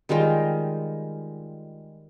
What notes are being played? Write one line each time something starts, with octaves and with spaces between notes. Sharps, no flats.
D#3 G3 G#3 F4